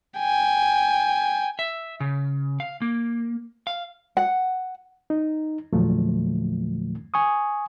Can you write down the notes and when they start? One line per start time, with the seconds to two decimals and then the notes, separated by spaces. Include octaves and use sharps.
0.19 G5 G#5
1.59 E5
2.00 C#3
2.60 F5
2.82 A#3
3.67 F5
4.17 F#5
5.10 D#4
5.73 E2 A#2 D3 F3 F#3 A3
7.14 G#5 C#6 D#6